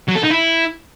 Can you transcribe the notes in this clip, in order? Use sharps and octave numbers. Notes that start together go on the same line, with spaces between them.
F#3
A4
D#4
E4